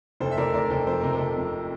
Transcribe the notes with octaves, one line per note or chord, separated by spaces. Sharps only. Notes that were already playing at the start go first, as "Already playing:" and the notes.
F1 A4 C5
E5
F1 A#4 D5
F1 A#4 D5
F1 A4 C5
F2 C5
C3 A#4
A4 C5
C3
F2